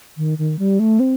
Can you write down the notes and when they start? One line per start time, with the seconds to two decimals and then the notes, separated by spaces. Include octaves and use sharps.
0.17 D#3
0.38 D#3
0.59 G3
0.79 A3
1.00 C4